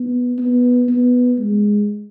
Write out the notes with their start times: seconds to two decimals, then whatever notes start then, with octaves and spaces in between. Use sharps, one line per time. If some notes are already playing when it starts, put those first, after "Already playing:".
Already playing: B3
0.38 B3
0.89 B3
1.39 G#3